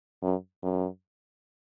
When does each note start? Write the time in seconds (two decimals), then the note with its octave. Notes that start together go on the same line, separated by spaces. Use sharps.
0.22 F#2
0.63 F#2